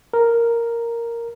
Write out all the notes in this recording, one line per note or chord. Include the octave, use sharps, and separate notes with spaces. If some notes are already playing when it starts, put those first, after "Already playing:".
A#4